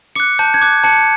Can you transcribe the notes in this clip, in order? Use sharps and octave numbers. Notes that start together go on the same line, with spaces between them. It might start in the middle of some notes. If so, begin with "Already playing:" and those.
D6 F#6 C#7
A5 G6
G#6
D6 F#6
A5 C#7